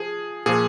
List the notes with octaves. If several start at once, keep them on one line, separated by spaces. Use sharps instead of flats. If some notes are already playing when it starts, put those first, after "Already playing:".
Already playing: F3 G#4
A#2 F3 G#4